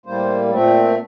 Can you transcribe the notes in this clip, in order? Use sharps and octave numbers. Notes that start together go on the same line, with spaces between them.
A2 G3 A#3 C5
A#2 A3 C4